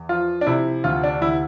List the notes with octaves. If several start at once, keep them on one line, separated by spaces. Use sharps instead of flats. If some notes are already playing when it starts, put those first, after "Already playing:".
Already playing: E2
F3 F4
D4
C3 E4
D2 F4
D4
D2 E4